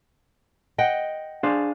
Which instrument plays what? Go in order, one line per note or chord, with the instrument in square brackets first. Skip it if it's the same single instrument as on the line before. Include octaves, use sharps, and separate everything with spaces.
[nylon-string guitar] D#5 F#5 G5
[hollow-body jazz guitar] D4 G#4 C5 [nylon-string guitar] F5